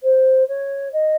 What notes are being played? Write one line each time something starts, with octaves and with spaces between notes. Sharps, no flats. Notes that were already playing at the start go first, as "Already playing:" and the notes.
C5
C#5
D#5